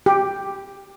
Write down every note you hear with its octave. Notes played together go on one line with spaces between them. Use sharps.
G4